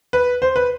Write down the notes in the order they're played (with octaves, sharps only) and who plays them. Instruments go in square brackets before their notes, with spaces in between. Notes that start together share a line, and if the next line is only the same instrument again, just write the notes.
[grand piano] B4
C5
B4